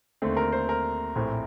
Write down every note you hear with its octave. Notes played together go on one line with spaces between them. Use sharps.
D#2 D3 A3 C4
A#4
C5
A#4
A#1 A2 A3 C4